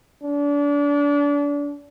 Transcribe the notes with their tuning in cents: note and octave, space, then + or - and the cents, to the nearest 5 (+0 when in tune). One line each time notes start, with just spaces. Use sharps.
D4 -30